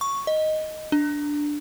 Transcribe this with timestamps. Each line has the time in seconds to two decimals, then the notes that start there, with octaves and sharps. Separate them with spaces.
0.01 C#6
0.27 D#5
0.92 D4